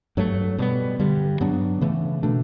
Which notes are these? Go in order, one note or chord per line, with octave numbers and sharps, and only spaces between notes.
G2 F#3 A3
B2 G3 B3
G2 D3 G3
G2 F#3 B3 D4
C#3 E3 A3
B2 A3 D4